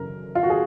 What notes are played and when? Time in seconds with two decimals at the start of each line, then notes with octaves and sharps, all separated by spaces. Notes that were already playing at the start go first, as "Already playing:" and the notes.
Already playing: F#2 C#3 F#3 A#4
0.35 F4
0.43 F#4
0.50 G#4